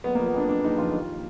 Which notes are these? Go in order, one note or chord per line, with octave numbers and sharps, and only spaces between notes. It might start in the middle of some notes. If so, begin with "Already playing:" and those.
F#1 B3
A#3
F3
B3
F2 D4
F#1 D4
F#1 D#4
F2 F4
D#2